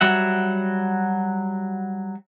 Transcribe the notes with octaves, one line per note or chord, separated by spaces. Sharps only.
F#3 G3 F#4 E5 F#5